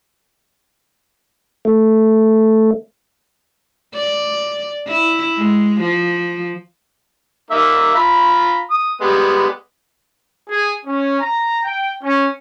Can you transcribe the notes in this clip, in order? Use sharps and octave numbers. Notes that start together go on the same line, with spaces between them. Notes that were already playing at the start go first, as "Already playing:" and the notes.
A3
D5
E4
G#3
F3
A#3 D#4 E5
F4 A#5 B5
D#6
G3 G#3 B3
G#4
C#4
A#5
G5
C#4